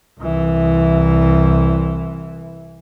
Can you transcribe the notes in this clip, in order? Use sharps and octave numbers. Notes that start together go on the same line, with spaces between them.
C2 E3